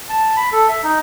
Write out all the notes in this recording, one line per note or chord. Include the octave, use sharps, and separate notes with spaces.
A5
B5
A4
E5
D#4